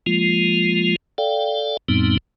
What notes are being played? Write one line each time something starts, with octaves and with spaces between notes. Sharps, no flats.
F3 G#3 A#3 F4
A4 D5 F5 G5
F2 A2 G3 B3 C4 D#4